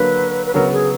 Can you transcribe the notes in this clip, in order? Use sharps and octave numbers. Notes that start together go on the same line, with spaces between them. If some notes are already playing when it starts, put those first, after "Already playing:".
Already playing: D3 F#3 A#3 B4
B4
C#3 F#3 B3 A#4
G#4